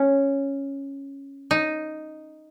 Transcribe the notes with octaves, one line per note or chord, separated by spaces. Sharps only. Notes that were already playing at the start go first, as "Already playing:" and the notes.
Already playing: C#4
D#4